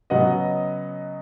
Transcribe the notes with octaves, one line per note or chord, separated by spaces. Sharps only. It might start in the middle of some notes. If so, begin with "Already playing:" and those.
C#3 F#3 B3 D#5 F#5